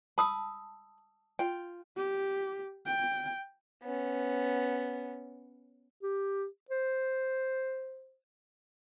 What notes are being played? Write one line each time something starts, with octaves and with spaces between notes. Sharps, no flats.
A5 B5 D#6 E6
F4 G5
G4
G5
B3 C#4
G4
C5